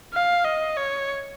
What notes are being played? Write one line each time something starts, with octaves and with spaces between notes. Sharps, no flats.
F5
D#5
C#5